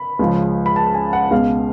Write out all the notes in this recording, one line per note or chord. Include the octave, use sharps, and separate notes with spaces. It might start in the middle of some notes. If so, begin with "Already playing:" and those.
Already playing: B5
C#2 C#3 F3
B5
A5
G#5
F#5
C#2 B2 F5